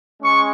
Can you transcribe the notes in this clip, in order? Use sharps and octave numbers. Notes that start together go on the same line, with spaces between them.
G#3 C#4 C#6